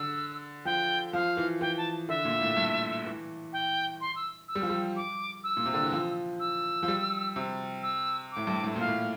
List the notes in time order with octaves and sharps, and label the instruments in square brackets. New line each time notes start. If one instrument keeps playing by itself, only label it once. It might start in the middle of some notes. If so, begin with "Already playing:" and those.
Already playing: [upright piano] D3 [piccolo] E6
[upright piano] F3 [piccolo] G5
[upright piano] F3 [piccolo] F5
[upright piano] E3
[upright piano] E3 [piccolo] G5
[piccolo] A5
[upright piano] D3 [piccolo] E5
[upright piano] A#2
A2
G2
E3
[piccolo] G5
C6
E6
E6
[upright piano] G3
F3
G3
[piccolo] D6
E6
[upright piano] A#2
C3
D3
E3
F3
[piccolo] E6
[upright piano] F3
G3
C3
[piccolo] E6
[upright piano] A2 [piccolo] D6
[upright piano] G2
A2
[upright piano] A#2 [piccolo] F5
[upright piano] A2